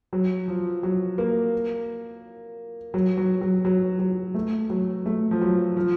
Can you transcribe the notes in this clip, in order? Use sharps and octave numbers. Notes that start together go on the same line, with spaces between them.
F#3
F3
F#3
A#3
F#3
F#3
F#3
F#3
F#3
A3
F#3
A3
F3
F#3
F3